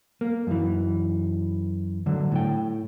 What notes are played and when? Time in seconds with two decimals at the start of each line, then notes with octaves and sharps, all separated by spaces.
0.21 A#3
0.47 F#2 E3
2.06 D3 F#3
2.32 A2 G5